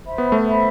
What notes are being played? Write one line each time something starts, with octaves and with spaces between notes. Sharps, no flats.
C5 E5 B5
B3
A3
C5 E5 B5